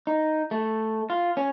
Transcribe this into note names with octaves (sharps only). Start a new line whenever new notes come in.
D#4
A3
F4
C#4